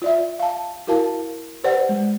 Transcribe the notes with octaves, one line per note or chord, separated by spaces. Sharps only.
F4 D5 E5
F5 A5
E4 F#4 A#4 F5 A5
G4 B4 C5 D5 F#5
G#3